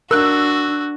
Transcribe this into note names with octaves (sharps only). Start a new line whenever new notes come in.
D4 F#4 A#4 E6 F#6